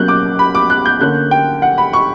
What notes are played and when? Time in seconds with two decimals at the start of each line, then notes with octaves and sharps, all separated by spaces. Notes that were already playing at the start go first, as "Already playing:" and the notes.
Already playing: B2 F#3 A#3 C#4 F#6 G6
0.08 D6
0.39 B5
0.55 D6
0.70 F#6
0.86 G6
1.01 D3 A#3 C#4 F#6
1.31 G5
1.62 F#5
1.78 B5
1.93 C#6